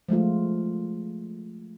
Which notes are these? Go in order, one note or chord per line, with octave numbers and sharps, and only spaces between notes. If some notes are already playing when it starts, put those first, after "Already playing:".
F3 G#3 A3 F4